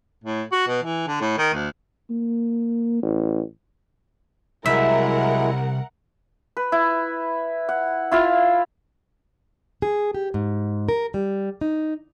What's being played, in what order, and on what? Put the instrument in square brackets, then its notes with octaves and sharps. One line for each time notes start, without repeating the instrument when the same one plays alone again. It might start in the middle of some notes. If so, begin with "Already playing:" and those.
[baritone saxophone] A2
F#4
B2
E3
D3
A2
D#3
D2
[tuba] A#3
A1
[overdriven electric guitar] C2 [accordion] F#3 G#3 E4 [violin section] A#4 F#5 [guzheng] E5
[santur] B4
E4
F#5
E4 F4 E5 F5
[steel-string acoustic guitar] G#4
G4
G#2
A#4
G3
D#4